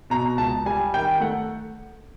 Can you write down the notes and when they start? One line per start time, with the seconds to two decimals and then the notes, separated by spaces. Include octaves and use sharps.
0.10 B2 A#5
0.38 C#2 A5
0.66 G3 G#5
0.94 D#3 G5
1.20 A3 F#5